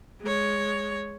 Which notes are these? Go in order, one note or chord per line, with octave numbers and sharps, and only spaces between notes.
G#3 C#5